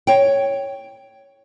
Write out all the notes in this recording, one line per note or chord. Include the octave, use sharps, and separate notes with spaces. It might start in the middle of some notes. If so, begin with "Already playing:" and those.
C#5 G5